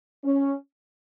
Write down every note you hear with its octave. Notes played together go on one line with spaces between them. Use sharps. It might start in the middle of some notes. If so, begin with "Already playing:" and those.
C#4